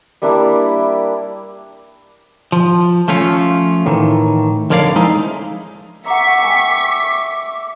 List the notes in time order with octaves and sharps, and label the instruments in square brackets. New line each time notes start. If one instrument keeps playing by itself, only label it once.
[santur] G3 A#3 D4 E4
[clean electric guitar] F3
F3 A3 C#4 F4
A2 D#3 E3
F2 D3 A#4 C#5 D5 F5
F3 G#3 D#4 E4
[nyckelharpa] E5 [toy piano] F#5 A#5 [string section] C#6 B6 [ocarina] D6
[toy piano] G5 G#5